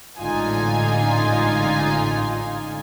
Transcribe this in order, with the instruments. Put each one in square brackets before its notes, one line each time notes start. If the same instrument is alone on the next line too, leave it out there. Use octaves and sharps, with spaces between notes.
[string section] A1 G#2 D3 D#4 F4 G#5